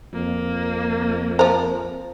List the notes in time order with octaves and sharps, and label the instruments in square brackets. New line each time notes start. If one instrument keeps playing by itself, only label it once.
[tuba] F2 [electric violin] A#3
[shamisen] F3 A#4 [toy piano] C5